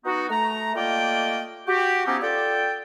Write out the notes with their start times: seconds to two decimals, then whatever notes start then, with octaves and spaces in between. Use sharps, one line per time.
0.05 B3 D#4 F#4
0.29 A3 A#5
0.75 A3 A#3 F4 D5 D#5 G5
1.67 F#4 G4
2.07 F3 B3 C#4 D#4 E4 G4
2.21 F4 A4 D5 G5